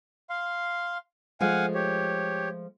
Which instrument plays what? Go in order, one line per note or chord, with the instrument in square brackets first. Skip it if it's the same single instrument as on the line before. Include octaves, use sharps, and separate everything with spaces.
[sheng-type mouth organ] F5 C6
[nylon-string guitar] F3 G#3 A3 [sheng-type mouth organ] F5 F#5 G#5
[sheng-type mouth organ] G4 C#5